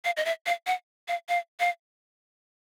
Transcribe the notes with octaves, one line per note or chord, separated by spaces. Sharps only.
F5
D#5
E5
F5
F#5
F5
F5
F5